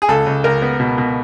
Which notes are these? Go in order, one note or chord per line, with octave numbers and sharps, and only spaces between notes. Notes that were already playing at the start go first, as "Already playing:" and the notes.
G#4
C#2 A4
C#2
C#2 A#4
B3
B2
B2